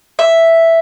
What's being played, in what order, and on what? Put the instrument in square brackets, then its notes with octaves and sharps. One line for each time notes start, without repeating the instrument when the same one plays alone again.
[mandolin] E5